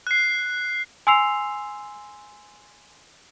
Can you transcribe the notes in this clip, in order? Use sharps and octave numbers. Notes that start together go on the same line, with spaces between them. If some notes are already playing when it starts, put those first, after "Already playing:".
F#6 C7
G#5 C6 E6 C7 F7